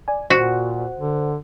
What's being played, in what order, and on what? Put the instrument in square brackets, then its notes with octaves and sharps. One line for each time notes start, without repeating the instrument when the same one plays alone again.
[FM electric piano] D5 G#5
[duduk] A#2 [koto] F#4 [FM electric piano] C5 F#5
[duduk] D3